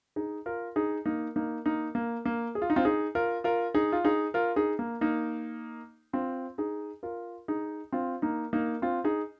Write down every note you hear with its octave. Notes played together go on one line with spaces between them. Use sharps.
D#4 G#4
F4 A#4
D#4 G#4
A#3 D#4
A#3 D#4
A#3 D#4
A#3
A#3
G#4
F4
D#4
C4 F4
D#4 G#4
F4 A#4
F4 A#4
D#4 G#4
F4
D#4 G#4
F4 A#4
D#4 G#4
A#3
A#3 D#4
C4 F4
D#4 G#4
F4 A#4
D#4 G#4
C4 F4
A#3 D#4
A#3 D#4
C4 F4
D#4 G#4